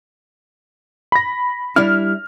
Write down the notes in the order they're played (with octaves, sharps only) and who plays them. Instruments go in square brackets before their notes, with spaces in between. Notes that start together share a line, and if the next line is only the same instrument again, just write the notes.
[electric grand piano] B5 A#6
[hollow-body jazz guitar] G3 D4 E4 [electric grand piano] F6